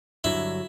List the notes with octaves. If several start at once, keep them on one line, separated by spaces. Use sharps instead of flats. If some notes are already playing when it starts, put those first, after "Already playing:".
G2 D3 F#3 E4